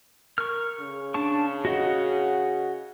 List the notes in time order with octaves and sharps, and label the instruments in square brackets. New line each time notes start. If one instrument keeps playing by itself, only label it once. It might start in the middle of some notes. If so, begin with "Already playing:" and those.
[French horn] A#4 [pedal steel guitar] C#6 F6
[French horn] C#3
[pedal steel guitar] D4 A5 C#6
F#4 D#5 F#5